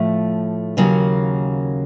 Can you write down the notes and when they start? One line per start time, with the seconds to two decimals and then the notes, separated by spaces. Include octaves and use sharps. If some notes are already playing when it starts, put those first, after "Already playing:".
Already playing: A2 F3 A3
0.77 D#2 C#3 F#3 A#3